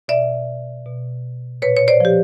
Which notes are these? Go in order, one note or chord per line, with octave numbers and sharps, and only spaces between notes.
B2 D5 E5
B2
A#2 B4 C#5
C#5
C5 D5
F3 G4